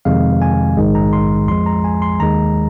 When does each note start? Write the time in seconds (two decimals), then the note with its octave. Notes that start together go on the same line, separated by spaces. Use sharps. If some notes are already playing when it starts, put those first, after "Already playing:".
0.05 F2 C3 D#3 G#3 F5
0.42 G#5
0.77 A#1 G#2 D#3 G#3
0.95 A#5
1.13 C6
1.48 F2 F3 G#3 C6
1.66 A#5
1.84 G#5
2.02 C6
2.20 D#2 D#3 G#3 A#5